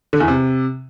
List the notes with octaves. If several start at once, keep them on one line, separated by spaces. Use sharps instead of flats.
D3
E2
C3